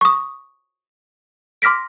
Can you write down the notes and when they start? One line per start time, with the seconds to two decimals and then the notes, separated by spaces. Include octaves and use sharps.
0.01 C#6 D#6
1.62 C6 D6 F6 A#6 B6 D7